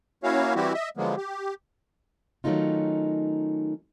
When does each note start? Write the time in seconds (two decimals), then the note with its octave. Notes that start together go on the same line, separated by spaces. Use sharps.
0.23 A#3 C#4 E4 F#4 C#5 F5
0.55 E3 G3 C4 E4 F#4 G4
0.74 D#5 E5
0.97 D3 F3 F#3 G#3 A#3 B3
1.17 G4
2.44 D#3 F#3 A3 C#4 D#4 F4